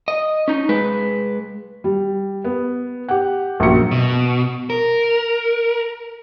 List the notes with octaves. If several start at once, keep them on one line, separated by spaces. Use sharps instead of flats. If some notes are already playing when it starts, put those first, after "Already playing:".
D#5
C#4 D#4
G#3 B4
G3
B3
G4 F#5
A#1 F#2 F#3 A#3 C#7
B2
A#4